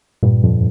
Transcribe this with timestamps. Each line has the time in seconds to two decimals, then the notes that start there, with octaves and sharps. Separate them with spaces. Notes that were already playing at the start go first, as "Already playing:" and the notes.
0.23 G2 A#2
0.44 F2